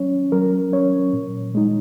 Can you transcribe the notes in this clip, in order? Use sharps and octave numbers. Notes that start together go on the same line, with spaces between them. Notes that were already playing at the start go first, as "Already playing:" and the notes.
Already playing: F#3 C#4 C#5
F#3 A#4
C#4 C#5
A#2
G#3 D#4